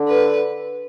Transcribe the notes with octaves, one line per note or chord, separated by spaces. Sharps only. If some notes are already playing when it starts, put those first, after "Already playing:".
Already playing: D3
B4